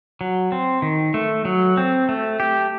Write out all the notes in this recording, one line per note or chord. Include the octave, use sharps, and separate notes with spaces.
F#3
C4
D#3
A3
F#3
C4
A3
G4